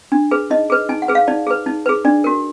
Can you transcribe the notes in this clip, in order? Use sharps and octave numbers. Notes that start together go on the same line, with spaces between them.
D4
G#4 B4
D#4 D#5
G#4 B4
D#4 G#5
F#5
G#4 B4
F5
D#4 D5
G#4 B4
D#4
G#4 B4
D4 D5
F#4 A#4